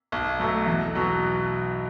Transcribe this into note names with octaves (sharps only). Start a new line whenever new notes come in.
B1
B2 F#3 A3
E2
B2 F#3